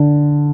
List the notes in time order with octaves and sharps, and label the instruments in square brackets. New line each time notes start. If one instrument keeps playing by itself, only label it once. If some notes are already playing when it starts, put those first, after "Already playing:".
Already playing: [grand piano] D3